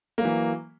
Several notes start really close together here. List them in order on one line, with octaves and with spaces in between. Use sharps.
A#3 F#3 E3